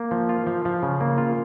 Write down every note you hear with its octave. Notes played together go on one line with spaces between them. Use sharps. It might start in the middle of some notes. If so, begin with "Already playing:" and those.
Already playing: A#3
F3
F4
F3
F3
C#3
A#3
F4